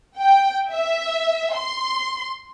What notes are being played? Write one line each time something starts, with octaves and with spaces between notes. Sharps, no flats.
G5
E5
C6